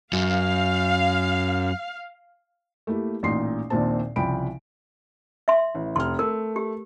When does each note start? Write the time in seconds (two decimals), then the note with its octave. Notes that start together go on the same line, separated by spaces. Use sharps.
0.13 F#2 F5
2.87 A3 A#3 E4 G4
3.23 A1 A#2 D#4 C6 C7
3.70 A#1 D#2 A#2 C4 C5 A5
4.16 C2 C#3 F3 G5 B5 D7
5.48 E5 C6
5.75 A1
5.96 F1 C6 F6
6.19 A3 A#4
6.56 G4